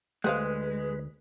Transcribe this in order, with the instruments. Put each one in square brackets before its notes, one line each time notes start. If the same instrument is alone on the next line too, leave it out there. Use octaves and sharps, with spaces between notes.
[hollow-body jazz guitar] D2 A3 [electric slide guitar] G#3 [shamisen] G4 C5 F5 [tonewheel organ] B4